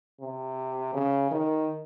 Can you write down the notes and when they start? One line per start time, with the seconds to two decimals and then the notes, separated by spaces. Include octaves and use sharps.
0.20 C3
0.94 C#3
1.31 D#3